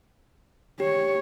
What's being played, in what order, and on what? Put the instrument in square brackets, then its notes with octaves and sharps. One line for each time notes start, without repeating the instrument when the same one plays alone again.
[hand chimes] G4 [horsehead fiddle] C#5